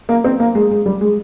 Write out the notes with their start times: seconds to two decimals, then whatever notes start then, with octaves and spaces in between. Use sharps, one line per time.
0.09 A#3
0.24 C4
0.40 A#3
0.55 G#3
0.71 G#3
0.86 G3
1.01 G#3